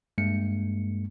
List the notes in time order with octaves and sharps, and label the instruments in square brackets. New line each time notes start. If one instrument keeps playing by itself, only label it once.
[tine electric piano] G2 G#3 A#3 C#7